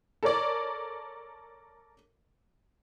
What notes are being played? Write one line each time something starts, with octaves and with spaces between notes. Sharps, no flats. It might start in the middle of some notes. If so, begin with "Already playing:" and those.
A4 A#4 C#5 D5